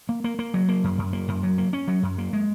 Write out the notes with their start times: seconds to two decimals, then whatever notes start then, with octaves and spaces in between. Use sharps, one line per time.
0.09 A#3
0.24 A#3
0.39 A#3
0.54 F#3
0.68 A#3
0.84 F#2
0.98 F#2
1.13 A#3
1.28 F#2
1.43 F#3
1.58 A#3
1.73 C#4
1.88 F#3
2.03 F#2
2.18 A#3
2.33 G#3